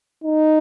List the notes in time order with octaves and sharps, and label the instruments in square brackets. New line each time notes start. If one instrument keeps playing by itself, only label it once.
[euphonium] D#4